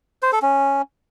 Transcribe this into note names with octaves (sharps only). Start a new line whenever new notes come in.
C5
A4
C#4